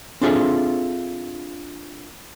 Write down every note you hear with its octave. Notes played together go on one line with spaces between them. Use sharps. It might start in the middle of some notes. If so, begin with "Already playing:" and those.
C4 D4 F4 G#4 A4 E5